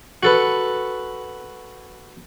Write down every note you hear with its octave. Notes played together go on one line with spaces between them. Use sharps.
F#4 A4 B4